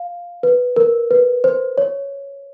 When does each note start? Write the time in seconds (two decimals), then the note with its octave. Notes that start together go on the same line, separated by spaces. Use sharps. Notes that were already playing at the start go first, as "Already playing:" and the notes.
Already playing: F5
0.43 B4
0.76 A#4
1.11 B4
1.44 C5
1.78 C#5